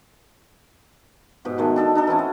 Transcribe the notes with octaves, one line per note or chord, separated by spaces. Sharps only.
G#2 B2 G4
D#3 G#3 A3
D4 A4 D#5
D4 D#4 A4
E3 C4 C#4 F#4
D#5